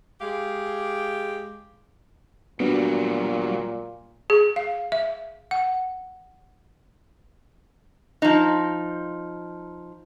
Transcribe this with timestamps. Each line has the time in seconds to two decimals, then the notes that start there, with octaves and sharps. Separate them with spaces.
0.21 G#3 G4 F5
2.60 A#2 F#3 G3 B3 D4 F#4
4.30 G#4
4.56 F5
4.92 E5
5.51 F#5
8.22 F3 D#4